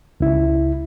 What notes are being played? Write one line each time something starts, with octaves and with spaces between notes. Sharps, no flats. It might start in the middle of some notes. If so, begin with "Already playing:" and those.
C#2 E4